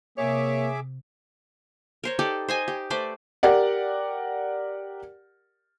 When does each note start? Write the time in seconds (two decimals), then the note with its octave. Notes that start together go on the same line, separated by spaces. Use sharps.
0.18 C3 A#3 G#4 C#5 E5 D6
2.04 A#4 C5 C#5
2.19 D#4 G4 A4 D5
2.49 C5 D#5 G#5
2.68 G4
2.90 A3 B4 C5 D5
3.43 G4 A#4 D5 F#5